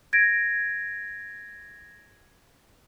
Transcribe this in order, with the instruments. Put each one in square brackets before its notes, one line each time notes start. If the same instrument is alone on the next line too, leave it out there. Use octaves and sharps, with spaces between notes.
[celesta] G#6 A#6 D7